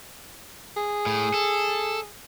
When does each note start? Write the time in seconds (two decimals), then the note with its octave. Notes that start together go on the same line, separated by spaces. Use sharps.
0.77 G#4
1.06 A2
1.34 A4